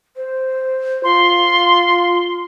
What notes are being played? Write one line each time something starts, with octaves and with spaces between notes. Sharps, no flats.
C5
F4 C6